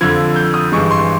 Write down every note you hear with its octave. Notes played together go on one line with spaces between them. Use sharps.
F2 D3 F3 G#6
G6
D#6
G2 E3 G#3 C#6
C6